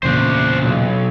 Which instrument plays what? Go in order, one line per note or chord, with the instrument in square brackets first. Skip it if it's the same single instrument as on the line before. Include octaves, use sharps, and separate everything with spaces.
[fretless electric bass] E2 A#2 C#3 [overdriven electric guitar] D4 C5
[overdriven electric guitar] B1